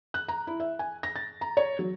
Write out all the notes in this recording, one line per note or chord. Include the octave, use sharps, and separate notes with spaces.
F#6
A#5
E4
E5
G#5
A#6
A6
A#5
C#5
F#3